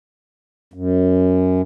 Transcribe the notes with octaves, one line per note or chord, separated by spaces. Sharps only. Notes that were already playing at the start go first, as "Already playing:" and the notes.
F#2